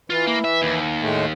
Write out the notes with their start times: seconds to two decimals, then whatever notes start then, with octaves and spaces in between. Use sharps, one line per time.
0.10 E3 F4
0.27 A#3
0.44 E5
0.62 D#2
1.01 A2 G#3 A3